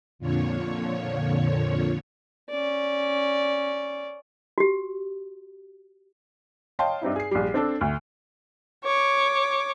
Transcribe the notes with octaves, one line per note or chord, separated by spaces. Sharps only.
F2 A#2 D3 F3 C#5
C#4 D5
F#4 G4
C#5 D#5 F5 G5 A5 C6
G2 C4 D#4 E4
G#4 C7
A#1 G3
C4 D4 A4
D2
C#5 D6